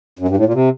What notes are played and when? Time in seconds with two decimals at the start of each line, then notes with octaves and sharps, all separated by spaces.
0.19 F#2
0.28 G2
0.37 A2
0.45 A#2
0.54 C3